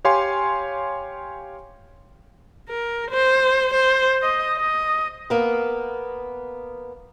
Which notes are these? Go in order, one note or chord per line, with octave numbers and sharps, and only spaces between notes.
G4 C#5 F5 G#5 C6
A#4
C5
C5
D#5
D#5
A#3 B3